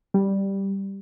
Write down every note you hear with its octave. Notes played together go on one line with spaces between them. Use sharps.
G3